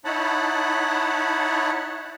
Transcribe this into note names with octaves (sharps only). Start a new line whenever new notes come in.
D#4 E4 C#5 F#5 A5 B5